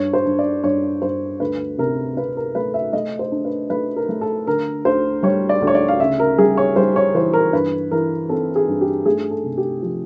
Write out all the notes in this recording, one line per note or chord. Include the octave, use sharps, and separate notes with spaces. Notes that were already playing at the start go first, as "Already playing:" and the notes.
Already playing: G2 C#5
C5
G2
D5
G2 C#5
G2 C5
D2 B4
C3 A#4
C3 B4
A#4
A3 B4
E5
A3 D#5
C5
D4
B4
A3 B4
A#4
A3
A4
D3 A#4
D2 C5
G3 C#5
D5
D2
C#5
D5
F5
C#3 E5
A#4
G3 G#4
C#5
G3 C5
C#5
E3 C5
A#4
G2 B4
E3 A#4
C4 A4
G#4
G2
G4
A3 G#4
A4
C3
G4
F3 G4